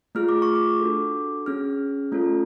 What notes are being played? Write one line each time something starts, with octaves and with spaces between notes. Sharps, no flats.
A3 F4 G#4 F6
D6
C#6
D6
D4 F#4 A4
C#4 G#4 F6
A3 C#4 F4 A4